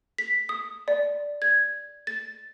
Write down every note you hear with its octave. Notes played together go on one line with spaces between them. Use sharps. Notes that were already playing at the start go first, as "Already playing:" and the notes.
B6
D#6
D5
G#6
A6